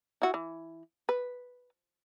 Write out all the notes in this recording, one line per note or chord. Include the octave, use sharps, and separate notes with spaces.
E4 F#4
E3
B4